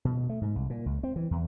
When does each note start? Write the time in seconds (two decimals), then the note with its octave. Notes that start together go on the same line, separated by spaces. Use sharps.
0.05 B2
0.29 A3
0.41 G#2
0.56 C2
0.70 A#2
0.86 C#2
1.03 C4
1.16 E3
1.31 E2